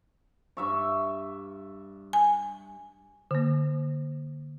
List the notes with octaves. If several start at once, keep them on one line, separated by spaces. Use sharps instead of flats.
G2 E5 C#6
G#5
D3 A#3